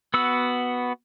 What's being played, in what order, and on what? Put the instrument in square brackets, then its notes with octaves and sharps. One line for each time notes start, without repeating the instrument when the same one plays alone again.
[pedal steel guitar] B3 F#4 F#5 E6